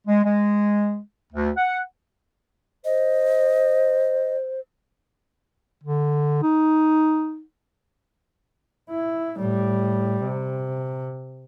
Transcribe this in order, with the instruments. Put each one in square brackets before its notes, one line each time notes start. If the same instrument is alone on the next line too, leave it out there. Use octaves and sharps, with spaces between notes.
[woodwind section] G#3
G#3
D2
F#5
[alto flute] C5 [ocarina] D#5
[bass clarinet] D3
D#4
[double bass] E4
A2 G3
C3